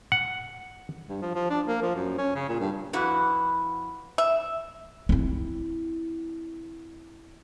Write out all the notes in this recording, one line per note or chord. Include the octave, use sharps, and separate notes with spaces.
F#5
G2
F3
F3
D4
A#3
F3
F#2
C#4
C#3
A#2
G2
F2 E4 F#4 B4
E5
C4 E4